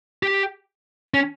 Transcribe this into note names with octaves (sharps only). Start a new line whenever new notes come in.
G4
C#4